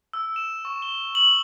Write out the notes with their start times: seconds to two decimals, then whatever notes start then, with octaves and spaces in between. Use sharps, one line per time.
0.13 E6
0.36 E7
0.65 C#6
0.82 G7
1.15 F#7